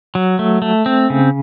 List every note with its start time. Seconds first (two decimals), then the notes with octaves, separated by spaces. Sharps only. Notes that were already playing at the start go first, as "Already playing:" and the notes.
0.15 F#3
0.39 A3
0.62 A3
0.86 C4
1.10 C#3